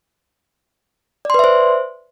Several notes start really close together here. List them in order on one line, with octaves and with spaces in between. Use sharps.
D5 C6 B4 E5 C5